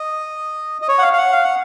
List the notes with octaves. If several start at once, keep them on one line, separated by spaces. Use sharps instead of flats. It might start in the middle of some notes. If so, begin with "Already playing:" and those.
Already playing: D#5
D#5
C#5
F#5
F5
F5
F#5
F5
F#5